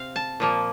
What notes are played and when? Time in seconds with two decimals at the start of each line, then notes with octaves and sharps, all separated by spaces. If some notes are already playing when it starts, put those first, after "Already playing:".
Already playing: C3 C4 F5
0.16 A5
0.40 A#2 F3 A#3